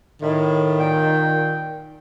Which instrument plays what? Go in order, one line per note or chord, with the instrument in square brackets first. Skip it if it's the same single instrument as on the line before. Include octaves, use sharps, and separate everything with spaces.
[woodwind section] A2 [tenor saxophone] D#3
[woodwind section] A#2 G5